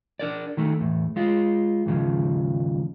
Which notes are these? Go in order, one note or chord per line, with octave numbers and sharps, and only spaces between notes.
D4 A#4 D5
D#3 A3
E2 A2
G#3 F4
D#2 G#2 C#3 F3